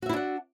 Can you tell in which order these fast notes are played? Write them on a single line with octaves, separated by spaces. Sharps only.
F#4 E5 E4 D4 F#5